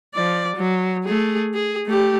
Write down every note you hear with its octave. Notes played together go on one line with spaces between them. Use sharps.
F3 D5
F#3
A3 G#4
G#4
A3 G4